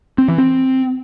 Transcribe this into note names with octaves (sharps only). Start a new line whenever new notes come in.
C4
E3
C4